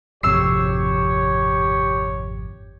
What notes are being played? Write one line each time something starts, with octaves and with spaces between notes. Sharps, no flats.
G#1 F2 C3 G4 C#5 E6 C7